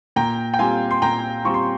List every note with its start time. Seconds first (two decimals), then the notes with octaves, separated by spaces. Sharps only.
0.16 A#2 G5 A#5
0.54 G5
0.59 G3 C4 F4 F5 G#5
0.91 C6
1.02 A#2 G5 A#5
1.44 G3 C4 F4 C#6
1.54 C6